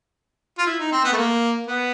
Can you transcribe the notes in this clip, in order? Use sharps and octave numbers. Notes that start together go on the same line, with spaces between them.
F4
E4
D#4
C4
B3
A3
A#3
B3